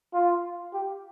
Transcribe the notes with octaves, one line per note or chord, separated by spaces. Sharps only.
F4
G4